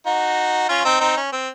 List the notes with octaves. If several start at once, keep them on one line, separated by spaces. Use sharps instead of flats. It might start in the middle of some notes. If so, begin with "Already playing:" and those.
D#4 F#4
C#4 F4
C4 D#4
C4 D#4
C#4
C4